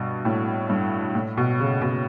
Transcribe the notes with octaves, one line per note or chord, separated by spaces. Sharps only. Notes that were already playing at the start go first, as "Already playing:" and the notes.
Already playing: G2 B2
A2
G2
A2
B2
C#3
B2